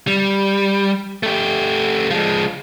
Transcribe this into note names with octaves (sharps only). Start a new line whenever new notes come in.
G3
A3 G4
F3 G#3